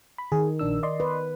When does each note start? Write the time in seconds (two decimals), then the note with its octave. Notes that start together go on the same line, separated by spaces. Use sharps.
0.18 B5
0.32 D#3 G#4
0.59 A#1 D4 E6
0.83 D5 D#5 C6
1.00 B4